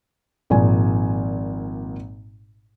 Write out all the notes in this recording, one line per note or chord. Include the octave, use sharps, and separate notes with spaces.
G#1 A#2 F3 G#5